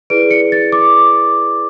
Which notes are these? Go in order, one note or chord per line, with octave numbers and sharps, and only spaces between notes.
E4 G#4 B4 D5 D7
C#7
A6
D6